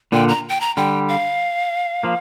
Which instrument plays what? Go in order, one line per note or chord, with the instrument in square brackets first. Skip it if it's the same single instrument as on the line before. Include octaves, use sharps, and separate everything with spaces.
[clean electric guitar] A#2 D3 [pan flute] G5
[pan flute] A#5
G5
A#5
[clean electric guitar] D3 G3 [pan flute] G5
[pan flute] F5
[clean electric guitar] F3 A#3